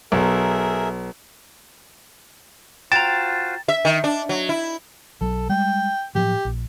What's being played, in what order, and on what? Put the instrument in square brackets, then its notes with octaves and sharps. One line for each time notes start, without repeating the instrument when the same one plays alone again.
[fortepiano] B1 [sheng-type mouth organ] G#4 A#4 E5
[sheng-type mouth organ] F4 F#4 C5 [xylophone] G5 A#5 [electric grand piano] A6 E7
[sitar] E5
D#3
D4
F#3
E4
[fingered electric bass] B1 F#3 [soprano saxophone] A4
[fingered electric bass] G3 G#3 [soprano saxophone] G5
[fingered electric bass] A2 F3 F#3 [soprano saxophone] G4
[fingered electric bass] A#1